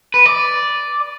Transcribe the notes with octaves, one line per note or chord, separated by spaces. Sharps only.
B4
D5